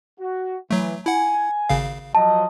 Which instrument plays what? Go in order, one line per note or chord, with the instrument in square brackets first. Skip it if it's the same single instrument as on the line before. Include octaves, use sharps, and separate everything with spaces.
[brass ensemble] F#4
[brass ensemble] E3 [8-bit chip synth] F#3 A3
[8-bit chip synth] E4 F#5 [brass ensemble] G#5
[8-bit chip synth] G#1 C#3 F5
[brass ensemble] F3 F#3 D#5 [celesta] A5